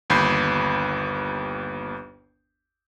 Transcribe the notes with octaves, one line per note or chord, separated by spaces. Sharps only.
G1 D#2 B5 G6 C7